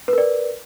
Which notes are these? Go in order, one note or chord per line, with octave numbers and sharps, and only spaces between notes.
A#4 B4 D5